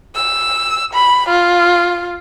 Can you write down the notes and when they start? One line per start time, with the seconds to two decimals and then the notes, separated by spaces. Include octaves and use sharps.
0.15 E6
0.93 B5
1.29 F4